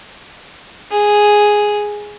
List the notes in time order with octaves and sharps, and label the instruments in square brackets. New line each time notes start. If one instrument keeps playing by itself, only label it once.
[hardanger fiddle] G#4